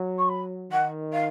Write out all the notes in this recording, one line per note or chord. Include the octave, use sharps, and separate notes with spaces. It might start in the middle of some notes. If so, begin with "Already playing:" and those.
Already playing: F#3
C#6
B5
D#3 F#5
F5